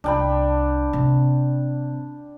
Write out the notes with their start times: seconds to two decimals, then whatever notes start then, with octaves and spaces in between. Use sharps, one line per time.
0.04 C2 D4 G5 B5
0.93 C3